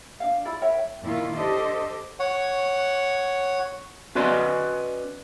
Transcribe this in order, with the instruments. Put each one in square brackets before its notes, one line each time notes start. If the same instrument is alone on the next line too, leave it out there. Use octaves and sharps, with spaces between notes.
[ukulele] D4 F5
E4 F4 D5 B5
A#4 C#5 E5 G5
[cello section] A#2 D#3 E4 F4
D4 G4 A4 C5 D#5
[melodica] C#5 F#5
[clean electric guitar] C#4 F#4 B4 D5 D#5 C6